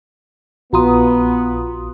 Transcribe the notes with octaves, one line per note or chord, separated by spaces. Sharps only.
A#1 B3 F4 F#4 A#5 C6 D#6